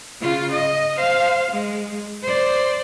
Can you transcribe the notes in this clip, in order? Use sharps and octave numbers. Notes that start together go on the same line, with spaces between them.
C#3 F4
D#5
C5 F5
G#3
C5 D5